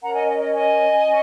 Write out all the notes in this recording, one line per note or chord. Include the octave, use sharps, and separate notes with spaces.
C#4 A#4 C#5 F#5 A#5
D#5 G#5
D#5
D#5
D#5 G#5
C#4